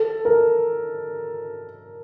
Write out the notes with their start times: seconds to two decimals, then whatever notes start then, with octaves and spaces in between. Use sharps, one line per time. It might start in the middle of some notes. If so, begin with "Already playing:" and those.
Already playing: A4
0.25 A#4